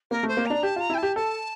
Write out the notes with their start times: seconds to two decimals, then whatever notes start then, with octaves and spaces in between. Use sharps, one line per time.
0.11 A#3 A#4
0.23 A3
0.28 C5
0.37 A#3
0.46 D4 A#5
0.63 G4 A5
0.76 F4 A#5
0.90 E4
0.94 G5
0.98 G4 A5
1.16 A4 A5